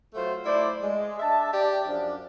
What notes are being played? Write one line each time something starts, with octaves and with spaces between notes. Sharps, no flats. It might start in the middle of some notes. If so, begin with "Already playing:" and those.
F#3 A3 F4 F#4 C5
A3 E4 C5 D5
G#3
D4 E5 A5
G4 D5
F#2 F3 D4